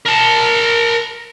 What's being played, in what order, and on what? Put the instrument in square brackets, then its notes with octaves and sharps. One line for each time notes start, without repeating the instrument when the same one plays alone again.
[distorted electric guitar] A#4 A5